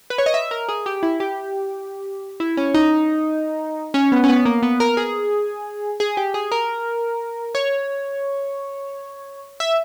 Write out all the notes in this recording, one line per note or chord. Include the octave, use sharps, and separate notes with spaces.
B4
C#5
D#5
E5
A#4
G#4
G4
E4
G4
E4
C#4
D#4
C#4
B3
C#4
B3
A#3
B3
A#4
G#4
G#4
G4
G#4
A#4
C#5
E5